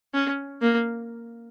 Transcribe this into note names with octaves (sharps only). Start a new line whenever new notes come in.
C#4
A#3